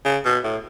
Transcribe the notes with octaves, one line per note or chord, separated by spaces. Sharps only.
C#3
B2
A2